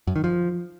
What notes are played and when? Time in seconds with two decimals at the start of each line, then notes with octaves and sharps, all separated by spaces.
0.07 F#2
0.16 D#3
0.24 F3